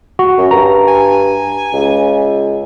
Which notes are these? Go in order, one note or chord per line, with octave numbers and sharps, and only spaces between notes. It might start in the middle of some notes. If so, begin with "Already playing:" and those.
F#4
F#2
G2 A#5
G#5
C#2